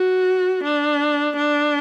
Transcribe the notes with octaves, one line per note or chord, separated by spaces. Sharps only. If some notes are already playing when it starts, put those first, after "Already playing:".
Already playing: F#4
D4
D4